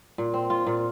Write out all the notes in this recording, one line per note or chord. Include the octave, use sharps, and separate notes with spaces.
A#2
C4
F4
A#2